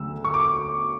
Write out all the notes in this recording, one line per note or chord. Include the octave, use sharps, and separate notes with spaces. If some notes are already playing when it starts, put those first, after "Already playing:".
Already playing: D2 C#3 F#3 E6
C#6
D6